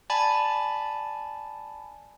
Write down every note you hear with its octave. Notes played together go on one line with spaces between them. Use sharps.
D5 G#5 A5 B5